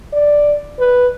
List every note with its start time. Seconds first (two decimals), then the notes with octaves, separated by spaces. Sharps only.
0.13 D5
0.79 B4